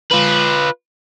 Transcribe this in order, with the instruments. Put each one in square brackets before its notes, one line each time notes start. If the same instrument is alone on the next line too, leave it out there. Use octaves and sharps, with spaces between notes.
[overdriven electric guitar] F4 B4